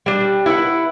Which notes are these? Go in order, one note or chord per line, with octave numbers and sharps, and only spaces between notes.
G3 D4
E4 B4 D#5 F#5